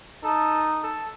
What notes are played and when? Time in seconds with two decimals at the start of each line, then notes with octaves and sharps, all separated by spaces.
0.24 D#4 A4
0.83 A4